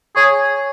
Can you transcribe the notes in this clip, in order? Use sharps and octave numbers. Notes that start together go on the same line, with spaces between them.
G#4 C#5 G#5 C#6